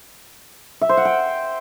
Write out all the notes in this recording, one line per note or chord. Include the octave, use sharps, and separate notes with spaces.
E5
C5
F#5
G5